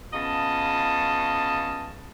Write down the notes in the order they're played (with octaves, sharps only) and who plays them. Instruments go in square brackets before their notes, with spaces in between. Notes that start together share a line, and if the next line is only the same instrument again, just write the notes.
[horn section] C#3 B3 F4 D#5 A5